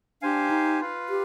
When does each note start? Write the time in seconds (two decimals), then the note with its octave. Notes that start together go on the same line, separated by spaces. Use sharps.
0.22 D4 G4 C5 F5 G#5
0.51 D#4
0.81 F4 B4 F5
1.09 G4